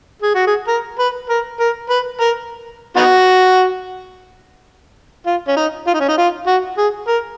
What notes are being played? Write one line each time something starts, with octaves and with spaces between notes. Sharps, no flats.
G#4
F#4
G#4
A#4
B4
A#4
A#4
B4
A#4
B3 D#4 F#4
F4
C#4
D#4
F4
D#4
C#4
D#4
F4
F#4
G#4
A#4